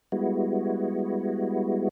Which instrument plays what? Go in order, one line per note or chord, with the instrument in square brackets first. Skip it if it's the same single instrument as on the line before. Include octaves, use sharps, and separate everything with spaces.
[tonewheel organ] G3 G#3 B3 E4 F#4